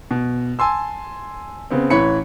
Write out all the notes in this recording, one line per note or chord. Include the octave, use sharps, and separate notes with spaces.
B2
G#5 A5 C6 E6
C#3 B3 C4
A1 E3 C#5 B5 C#7